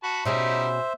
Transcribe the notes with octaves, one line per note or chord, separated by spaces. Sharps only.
F#4 A5 B5
B2 G3 C#4 D#4 E4 G#4 C5 E5